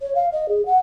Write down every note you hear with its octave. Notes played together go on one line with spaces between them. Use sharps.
C#5
F5
D#5
G#4
F#5